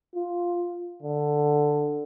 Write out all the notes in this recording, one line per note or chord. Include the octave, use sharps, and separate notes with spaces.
F4
D3